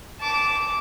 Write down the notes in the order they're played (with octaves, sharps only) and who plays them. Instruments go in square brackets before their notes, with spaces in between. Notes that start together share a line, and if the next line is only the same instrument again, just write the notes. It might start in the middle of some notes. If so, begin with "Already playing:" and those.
[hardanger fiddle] A5 D6